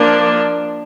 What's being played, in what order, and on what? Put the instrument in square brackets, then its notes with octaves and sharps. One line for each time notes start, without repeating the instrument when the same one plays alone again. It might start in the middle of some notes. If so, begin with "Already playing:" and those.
Already playing: [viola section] F3 A#3 D4